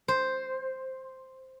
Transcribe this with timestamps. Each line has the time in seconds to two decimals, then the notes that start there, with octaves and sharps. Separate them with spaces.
0.08 C5